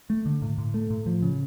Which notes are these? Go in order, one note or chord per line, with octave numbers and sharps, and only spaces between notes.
A3
D3
A2
A2
A3
A2
F3
C#3